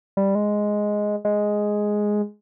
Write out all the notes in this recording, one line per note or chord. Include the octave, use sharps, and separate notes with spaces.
G3
G#3
G#3